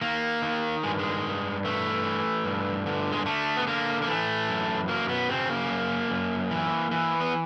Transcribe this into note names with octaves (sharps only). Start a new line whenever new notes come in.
D#3 A#3
D#3
G2 G#3
G#3
G2
E3 A3
E3
G2
D3
G#3
D3 A3
B3
D3 A#3
A#3
E3 A3
F#2
F#3 A#3
B3
C#3 C4
A#3
F#2
F#2
E3
E3
B3